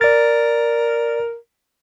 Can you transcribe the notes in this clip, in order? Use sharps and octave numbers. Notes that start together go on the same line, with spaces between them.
A#4 D5 A6